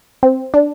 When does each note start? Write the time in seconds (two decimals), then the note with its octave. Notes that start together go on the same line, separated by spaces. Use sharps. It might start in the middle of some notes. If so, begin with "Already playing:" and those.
0.23 C4
0.54 D4